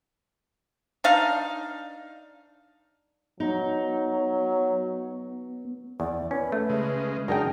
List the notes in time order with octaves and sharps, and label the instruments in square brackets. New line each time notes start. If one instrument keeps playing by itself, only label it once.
[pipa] D4 D#4 F5
[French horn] F#3 [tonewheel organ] B3 [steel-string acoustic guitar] D#4
[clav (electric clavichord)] E2 [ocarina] D5
[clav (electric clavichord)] C#4 [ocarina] B4
[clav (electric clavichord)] A3
[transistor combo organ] C#3 G#3
[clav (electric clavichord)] F#2 D4 G5 [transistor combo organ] D#4 A#4 [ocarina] G#4